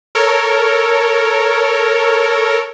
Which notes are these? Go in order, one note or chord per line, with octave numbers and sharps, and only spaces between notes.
A4 A#4 C#5